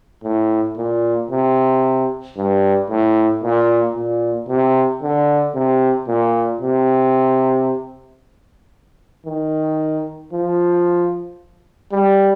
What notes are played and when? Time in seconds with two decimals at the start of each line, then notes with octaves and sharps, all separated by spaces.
0.23 A2
0.77 A#2
1.31 C3
2.37 G2
2.90 A2
3.43 A#2
3.95 A#2
4.48 C3
5.02 D3
5.55 C3
6.08 A#2
6.61 C3
9.26 D#3
10.33 F3
11.92 G3